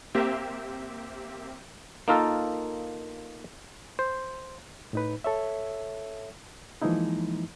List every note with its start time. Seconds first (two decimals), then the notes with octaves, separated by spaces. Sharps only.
0.15 A#3 C4 G4 E5
2.08 A#3 D#4 F4 A4 A#4
3.99 C5
4.93 A2 D#4 B4
5.24 A4 C#5 E5
6.82 E3 F3 G#3 A#3 D#4 E4